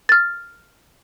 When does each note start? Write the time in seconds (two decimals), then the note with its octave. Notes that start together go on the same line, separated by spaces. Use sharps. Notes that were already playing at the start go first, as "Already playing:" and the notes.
0.09 F6 A6